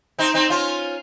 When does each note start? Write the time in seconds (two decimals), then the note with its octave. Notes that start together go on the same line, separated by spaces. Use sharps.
0.19 C4 D#4
0.34 C4 D#4
0.50 C#4 F4